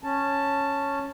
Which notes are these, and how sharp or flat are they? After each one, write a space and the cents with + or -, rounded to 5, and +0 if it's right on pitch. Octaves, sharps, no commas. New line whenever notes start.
C#4 -5 A5 +5